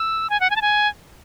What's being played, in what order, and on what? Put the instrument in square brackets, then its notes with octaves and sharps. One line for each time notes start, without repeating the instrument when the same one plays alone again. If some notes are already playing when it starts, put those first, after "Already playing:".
Already playing: [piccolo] E6
G#5
F#5
G#5
A5
G#5